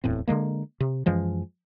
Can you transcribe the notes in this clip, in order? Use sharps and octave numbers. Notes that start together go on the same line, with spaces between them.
D1 E2 A2 C4
D3 D#3 G#3 A#3
C3
F#2 E3 F3 G#3